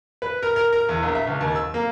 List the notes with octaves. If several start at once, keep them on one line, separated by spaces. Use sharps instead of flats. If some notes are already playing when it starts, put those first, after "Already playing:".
B4
A#4
A#4
A#4
E2
A#1
E5
C#2
D#2
E6
A#3